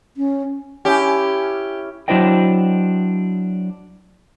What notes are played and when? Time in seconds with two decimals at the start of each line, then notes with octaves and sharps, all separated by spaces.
0.17 C#4
0.85 C#4 E4 G4
2.08 F#3 D4 E4 C5 D#5 G5